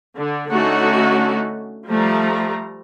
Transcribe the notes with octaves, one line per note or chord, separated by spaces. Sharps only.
D3
D3 A3 C#4 D#4 F#4
F3 G3 A3 A#5